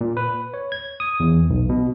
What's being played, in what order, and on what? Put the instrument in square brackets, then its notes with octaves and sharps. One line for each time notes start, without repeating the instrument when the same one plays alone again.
[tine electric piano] A#2
B4
C#5
G#6
D#6
E2
B1
B2